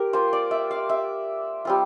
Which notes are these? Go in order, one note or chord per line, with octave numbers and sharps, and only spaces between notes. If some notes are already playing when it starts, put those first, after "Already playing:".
Already playing: C4 G4 A#4
A#3 F4 C5
D5
E5
F5
E5
G3 C4 F4